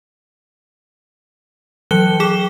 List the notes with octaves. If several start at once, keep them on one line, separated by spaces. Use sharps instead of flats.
E3 F#3 F#6 C#7 G7
G#4 G5 D6 E7 G7